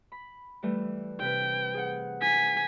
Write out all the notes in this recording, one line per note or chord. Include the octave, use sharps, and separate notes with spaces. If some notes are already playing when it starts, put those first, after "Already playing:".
B5
E3 G3 A3
C3 B4 G5
G#4 F#5
G#5 B6